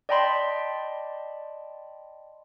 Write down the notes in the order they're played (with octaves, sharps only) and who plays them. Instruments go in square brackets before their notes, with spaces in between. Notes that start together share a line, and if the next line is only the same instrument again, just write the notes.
[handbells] D5 D#5 G5 A5 B5 C6